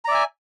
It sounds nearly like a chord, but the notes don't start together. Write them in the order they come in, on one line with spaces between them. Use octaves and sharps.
A#5 D5 E5 G#5